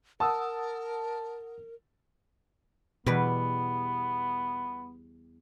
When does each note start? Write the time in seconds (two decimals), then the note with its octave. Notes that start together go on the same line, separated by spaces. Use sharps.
0.20 A#4 F#5 A5 D#6 E6
3.06 E2 B2 G3 B3 B4